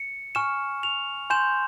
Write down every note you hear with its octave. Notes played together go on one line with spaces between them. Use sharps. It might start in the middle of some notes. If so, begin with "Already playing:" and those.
Already playing: C#7
G#5 C#6 F6 E7
F7
G#5 C6 G6 E7